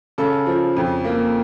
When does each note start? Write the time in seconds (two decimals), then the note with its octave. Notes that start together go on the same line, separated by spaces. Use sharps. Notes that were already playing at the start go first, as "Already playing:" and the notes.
0.18 C#3 A4
0.46 F3
0.77 F2
1.04 A#3